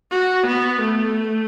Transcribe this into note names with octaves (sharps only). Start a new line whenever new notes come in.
F#4
B3
A3